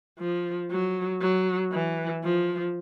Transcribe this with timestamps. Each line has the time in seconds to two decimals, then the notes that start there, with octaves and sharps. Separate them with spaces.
0.19 F3
0.70 F#3
1.21 F#3
1.72 E3
2.24 F3